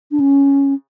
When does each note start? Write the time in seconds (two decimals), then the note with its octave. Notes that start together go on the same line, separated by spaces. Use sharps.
0.11 D4
0.20 C#4